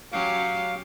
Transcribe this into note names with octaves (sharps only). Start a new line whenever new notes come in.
F#3 C#4 G4 F5